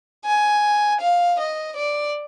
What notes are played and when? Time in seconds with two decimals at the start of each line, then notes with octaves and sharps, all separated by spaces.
0.25 G#5
1.01 F5
1.39 D#5
1.75 D5